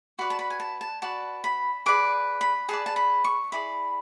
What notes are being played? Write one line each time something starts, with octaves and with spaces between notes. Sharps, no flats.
F#4 B4 D5 B5
A5
B5
G#5
A5
A5
F#4 B4 D5 A5
B5
G#4 B4 D5 D6
B5
G#4 B4 D5 A5
A5
B5
C#6
E4 G#4 D5 B5